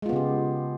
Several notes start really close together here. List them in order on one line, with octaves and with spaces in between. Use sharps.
G#3 F4 B3 C#3 G4